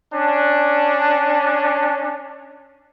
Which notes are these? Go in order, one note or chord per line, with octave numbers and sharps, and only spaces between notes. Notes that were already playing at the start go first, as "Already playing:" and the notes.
C#4 D4